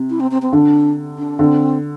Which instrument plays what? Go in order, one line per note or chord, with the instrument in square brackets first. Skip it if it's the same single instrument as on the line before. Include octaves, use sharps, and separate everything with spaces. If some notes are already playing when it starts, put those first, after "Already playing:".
Already playing: [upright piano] C3
[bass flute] E4
C4
C4
C4
[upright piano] D3 [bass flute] D4
[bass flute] D4
[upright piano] D3 [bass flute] C4